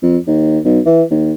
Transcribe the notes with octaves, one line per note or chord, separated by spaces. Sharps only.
F2
D#2
B1
E3
D#2